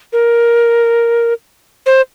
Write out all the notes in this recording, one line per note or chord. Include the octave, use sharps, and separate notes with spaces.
A#4
C5